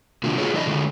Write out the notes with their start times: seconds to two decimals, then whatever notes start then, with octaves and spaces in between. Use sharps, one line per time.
0.23 C3 D#3 A#3 D4 F4 F#4
0.38 F4 F#4 G#4 C#5
0.54 E3 F#3 E4 D5 D#5
0.67 D3 G#3